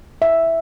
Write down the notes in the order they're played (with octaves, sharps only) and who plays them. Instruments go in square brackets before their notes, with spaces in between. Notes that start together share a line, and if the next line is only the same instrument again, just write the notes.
[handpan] E5